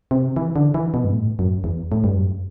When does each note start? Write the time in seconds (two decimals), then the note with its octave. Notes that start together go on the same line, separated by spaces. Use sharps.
0.11 C3
0.36 E3
0.56 D3
0.74 E3
0.94 B2
1.04 G2
1.13 A2
1.39 F#2
1.64 E2
1.92 A2
2.04 G2
2.15 F#2